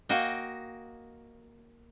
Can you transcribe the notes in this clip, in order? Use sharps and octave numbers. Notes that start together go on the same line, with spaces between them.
A#3 F#4 D#5 G5